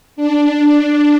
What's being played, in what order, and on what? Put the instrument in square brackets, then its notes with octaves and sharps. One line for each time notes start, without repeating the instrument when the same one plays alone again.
[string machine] D4